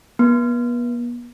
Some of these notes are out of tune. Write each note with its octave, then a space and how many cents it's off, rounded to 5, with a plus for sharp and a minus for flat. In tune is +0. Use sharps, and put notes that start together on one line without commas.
B3 -40